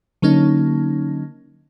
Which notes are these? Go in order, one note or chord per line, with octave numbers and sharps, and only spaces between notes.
D3 F#3 A#3 C#4 D#4